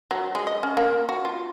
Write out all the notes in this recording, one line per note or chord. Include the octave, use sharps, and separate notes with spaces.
F#3
G#3
D#5
C#4
A#3
F#4
F4